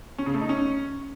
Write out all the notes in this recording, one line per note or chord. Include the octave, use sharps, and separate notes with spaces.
C#4
C#3
A3
D#4
C#4